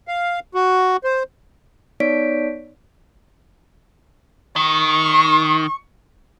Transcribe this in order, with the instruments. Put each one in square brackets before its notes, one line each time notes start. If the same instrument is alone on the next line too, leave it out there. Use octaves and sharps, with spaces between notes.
[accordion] F5
F#4
C5
[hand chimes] B3 D#4 C#5 D5 B6 D7
[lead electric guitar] D#3 [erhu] C#6